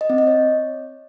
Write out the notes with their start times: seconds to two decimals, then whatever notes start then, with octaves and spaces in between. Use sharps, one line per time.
0.01 D#5
0.10 C4
0.18 D#5
0.27 C#5